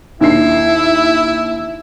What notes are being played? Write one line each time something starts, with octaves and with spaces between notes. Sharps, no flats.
D#2 D4 E4 C7